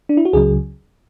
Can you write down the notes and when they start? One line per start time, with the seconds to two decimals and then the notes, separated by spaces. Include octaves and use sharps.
0.09 D4
0.17 E4
0.25 F#4
0.33 C#2 C#3 F#3 G#4